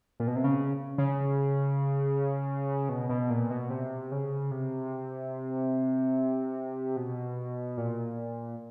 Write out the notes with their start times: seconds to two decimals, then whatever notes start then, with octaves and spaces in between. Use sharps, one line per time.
0.20 A#2
0.27 B2
0.36 C3
0.44 C#3
0.98 C#3
2.89 B2
3.09 B2
3.30 A#2
3.50 B2
3.70 C3
4.12 C#3
4.51 C3
6.96 B2
7.77 A#2